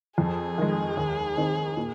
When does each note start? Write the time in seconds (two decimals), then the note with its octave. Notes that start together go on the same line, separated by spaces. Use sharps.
0.18 F2 G#4
0.58 D#3 G#3
0.97 D#2
1.37 D#3 C4 D#4
1.77 A#2